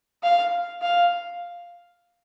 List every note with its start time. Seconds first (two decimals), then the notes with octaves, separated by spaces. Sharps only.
0.23 F5
0.82 F5